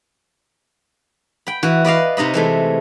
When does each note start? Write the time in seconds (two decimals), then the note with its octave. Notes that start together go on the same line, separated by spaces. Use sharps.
1.47 G5 B5
1.63 E3 F#4
1.85 B4 D5 D#5 F5
2.17 C3 D#4 D#5 B5
2.34 E3 G#3 A3